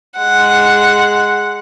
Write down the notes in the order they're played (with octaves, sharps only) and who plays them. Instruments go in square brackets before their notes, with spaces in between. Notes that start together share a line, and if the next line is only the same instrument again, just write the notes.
[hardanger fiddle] G#3 F#5